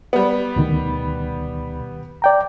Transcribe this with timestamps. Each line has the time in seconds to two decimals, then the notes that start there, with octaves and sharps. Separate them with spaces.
0.13 G3 B3
0.56 D2 B2 D#3
2.22 D5 G5 A#5